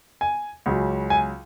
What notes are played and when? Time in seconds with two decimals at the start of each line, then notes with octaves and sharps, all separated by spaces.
0.21 G#5
0.66 C#2 C#3 F#3
1.10 G#5